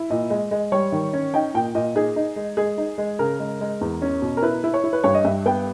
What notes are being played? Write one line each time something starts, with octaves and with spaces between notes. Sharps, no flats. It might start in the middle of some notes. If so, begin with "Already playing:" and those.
Already playing: E4
A#2 D#5
G#3
G#3
G3 C#5
D#3
C#4
D#4 G5
A#2 G5
A#2 D#5
D#4 G#4
D#4
G#3
G#3 G#4
D#4
G#3
C#3 A#4
G#3
G#3
E2
C#4
B2
A#4
E4 B4
E4
C#5
E4
B4
G2 C#5
D#5
G2 E5
B3 G5